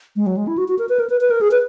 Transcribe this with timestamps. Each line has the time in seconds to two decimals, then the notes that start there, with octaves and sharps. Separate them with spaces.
0.16 G#3
0.26 F#3
0.37 G#3
0.47 E4
0.58 F#4
0.68 F#4
0.79 A#4
0.89 B4
0.99 A#4
1.10 B4
1.21 B4
1.31 A#4
1.41 G#4
1.51 B4